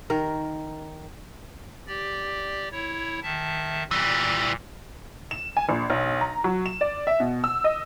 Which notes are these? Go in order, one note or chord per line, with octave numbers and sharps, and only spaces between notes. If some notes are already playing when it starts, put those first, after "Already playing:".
D#3 A#4
G4 D5
E4 C#5
D#3 E5 A5
A#2 E3 G3
E7
G#5
A#1
B1
A#5
F#3
E7
D5
E5
B2
E6
D#5